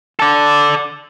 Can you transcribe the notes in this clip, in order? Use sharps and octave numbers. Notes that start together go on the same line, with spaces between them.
A4 D5